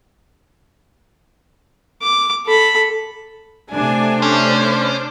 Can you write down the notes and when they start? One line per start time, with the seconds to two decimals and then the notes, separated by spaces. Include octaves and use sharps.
2.02 D6
2.46 A4 B5
3.71 C3 A3 D4 G#5
4.22 C#4 C5